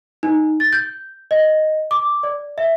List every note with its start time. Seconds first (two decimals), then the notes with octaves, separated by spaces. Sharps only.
0.23 D#4
0.60 A6
0.73 G6
1.31 D#5
1.91 D6
2.23 D5
2.58 E5